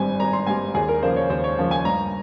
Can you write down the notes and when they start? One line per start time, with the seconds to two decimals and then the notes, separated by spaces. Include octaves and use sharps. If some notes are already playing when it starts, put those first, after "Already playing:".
Already playing: G#1 G2 G3 C4 G#5
0.20 G#1 A#5
0.33 C6
0.47 G2 G3 C4 G#5
0.74 D#2 G#4
0.88 A#4
1.02 C#3 F3 A#3 C5
1.16 C#5
1.30 D#2 C5
1.44 C#5
1.58 C#3 F3 A#3
1.71 G#5
1.85 G2 A#5